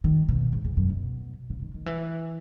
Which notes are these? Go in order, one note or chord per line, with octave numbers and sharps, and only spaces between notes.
D#3
B2
G#2
E2
F#2
B2
C#3
D#3
D#3
E3